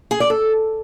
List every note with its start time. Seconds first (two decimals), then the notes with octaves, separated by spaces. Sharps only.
0.11 G#4
0.20 D5
0.30 A4